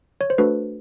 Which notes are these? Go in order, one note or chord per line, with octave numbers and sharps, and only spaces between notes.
C#5
C5
A3 D4 F#4 A4 B4